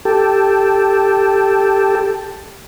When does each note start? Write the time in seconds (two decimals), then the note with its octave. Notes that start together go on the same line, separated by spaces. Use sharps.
0.05 G4 A4